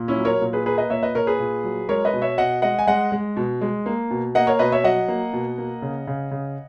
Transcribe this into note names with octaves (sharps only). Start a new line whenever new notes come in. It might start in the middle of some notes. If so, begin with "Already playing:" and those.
Already playing: A#2
C#4 E4
F#3
A#4 C#5
A#2
G#4 B4
A#3 G#4 B4
B4 D#5
A#2 C#5 E5
B4 D#5
A#2 A#4 C#5
G#4 B4
A#2
F#3
G#3 A#4 C#5
B4 D#5
B2
C#5 E5
B2 D#5 F#5
G#3 D#5 F#5
G#5
G#3 D#5 F#5
G#3
B2
G#3
A#3
B2
A#3 D#5 F#5
A#4 C#5
B2 B4 D#5
C#5 E5
F#3 D#5 F#5
A#3
B2
A#3
C#3
C#3
C#3